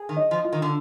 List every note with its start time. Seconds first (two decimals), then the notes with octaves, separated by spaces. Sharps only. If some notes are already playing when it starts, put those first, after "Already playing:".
Already playing: G#4
0.09 D#3
0.17 D#5
0.31 F3
0.44 F4
0.52 D#3
0.62 D3